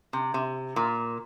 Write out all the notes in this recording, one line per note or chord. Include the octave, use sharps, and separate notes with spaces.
C3
C3
A#2